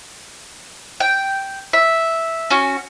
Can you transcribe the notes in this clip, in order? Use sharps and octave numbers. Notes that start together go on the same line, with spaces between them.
G5
E5
C#4 F#4